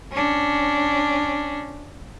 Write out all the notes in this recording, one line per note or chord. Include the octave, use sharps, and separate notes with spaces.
C#4 D4